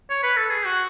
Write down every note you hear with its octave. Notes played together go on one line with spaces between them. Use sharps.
C#5
B4
A4
G#4
F#4